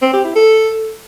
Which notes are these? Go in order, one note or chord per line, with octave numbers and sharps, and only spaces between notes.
C4
G4
E4
A4